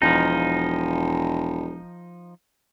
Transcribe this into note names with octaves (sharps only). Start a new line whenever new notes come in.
E1 F3 D#4